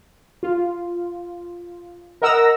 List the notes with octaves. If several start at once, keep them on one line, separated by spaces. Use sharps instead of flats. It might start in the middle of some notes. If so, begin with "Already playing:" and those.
F4
A#4 D#5 F#5 A#5 E6 A#6